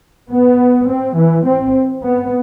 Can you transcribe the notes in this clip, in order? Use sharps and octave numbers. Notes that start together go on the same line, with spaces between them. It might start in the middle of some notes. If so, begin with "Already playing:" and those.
B3
C4
E3
C4
B3